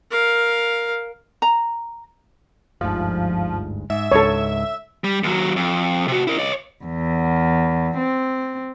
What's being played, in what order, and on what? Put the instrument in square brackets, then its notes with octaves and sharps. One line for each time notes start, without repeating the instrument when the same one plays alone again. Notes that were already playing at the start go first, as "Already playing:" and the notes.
[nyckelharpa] A#4 F5
[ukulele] A#5
[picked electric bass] G1 D2 G#2 [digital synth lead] F3
[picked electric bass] G#2 [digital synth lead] E5
[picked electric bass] C#2 G#2 [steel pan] A4 C#5
[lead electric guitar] G3
D#2 F#3
F2
C3 F#4
E4 A#4
C#5 D#5
[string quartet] E2
C4